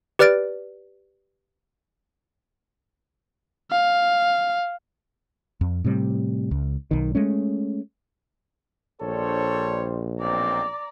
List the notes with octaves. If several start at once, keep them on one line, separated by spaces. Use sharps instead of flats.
G4 B4 D5 F6 A6 D7
F5
F2
A2 C3 F#3 G3
C#2
B1 D#3
G#3 A3 C#4
A#1 G3 D4 A4 C5 C#5
B1 C4 D5 A#5